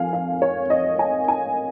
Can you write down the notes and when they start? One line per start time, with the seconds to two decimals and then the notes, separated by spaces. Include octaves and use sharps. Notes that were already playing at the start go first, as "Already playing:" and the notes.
Already playing: F2 F3 F5 G#5
0.13 F5
0.42 C#5
0.70 D#5
0.99 G#5
1.28 G#5